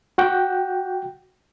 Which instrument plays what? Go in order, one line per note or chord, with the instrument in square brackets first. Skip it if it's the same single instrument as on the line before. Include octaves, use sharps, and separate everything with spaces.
[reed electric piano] F#4 F#5 G5